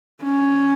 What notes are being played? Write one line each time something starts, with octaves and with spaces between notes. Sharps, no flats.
C#4